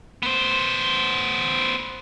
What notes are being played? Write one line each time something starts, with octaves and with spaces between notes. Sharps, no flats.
B3 C5